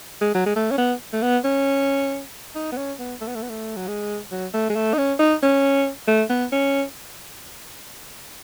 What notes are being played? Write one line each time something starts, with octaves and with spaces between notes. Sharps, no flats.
G#3
F#3
G#3
A3
C#4
B3
A3
B3
C#4
D#4
B3
C#4
B3
A3
B3
A3
B3
A3
F#3
G#3
F#3
A3
G#3
A3
D#4
C#4
D#4
C#4
A3
B3
C#4